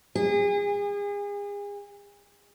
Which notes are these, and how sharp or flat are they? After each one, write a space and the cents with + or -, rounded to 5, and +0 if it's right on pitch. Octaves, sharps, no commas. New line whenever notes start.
G#4 -35